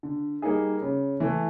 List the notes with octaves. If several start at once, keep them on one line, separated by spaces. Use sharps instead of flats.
D3
G3 A#3 D#4 G#4
C#3
E3 A3